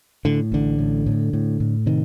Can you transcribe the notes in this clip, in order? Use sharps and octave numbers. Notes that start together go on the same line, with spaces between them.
A2 D3
A1 D3
A2
A2
A2
A2
C3 D#3